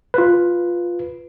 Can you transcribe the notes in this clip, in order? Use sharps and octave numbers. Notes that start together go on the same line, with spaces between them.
F4 B4